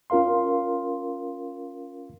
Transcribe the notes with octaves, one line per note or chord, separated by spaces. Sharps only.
C#4 F4 A#4 F5 C6